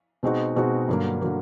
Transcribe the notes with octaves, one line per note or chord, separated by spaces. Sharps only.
B2 G#3 C4 D#4 F#4
B2 G#3 C4 D#4 F#4
G2 D3 F#3 A#3
D3 F#3 A#3